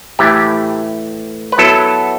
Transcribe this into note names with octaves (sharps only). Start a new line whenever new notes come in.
A2 E3 A3 G4
B4
F#3 B3 E4 A4